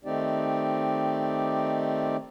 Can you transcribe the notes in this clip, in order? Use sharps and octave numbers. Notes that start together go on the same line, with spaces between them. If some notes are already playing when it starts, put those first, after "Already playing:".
D#3 A3 C4 D#4 G4 D5